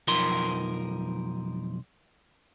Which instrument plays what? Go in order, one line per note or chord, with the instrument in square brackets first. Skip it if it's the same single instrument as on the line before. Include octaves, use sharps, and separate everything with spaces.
[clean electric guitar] B1 F2 F3 D#4 A#4 C6